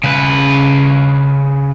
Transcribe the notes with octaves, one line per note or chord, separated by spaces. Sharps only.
C#3 B4